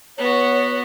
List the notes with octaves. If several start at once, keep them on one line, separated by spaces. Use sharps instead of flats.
B3 F#4 C#5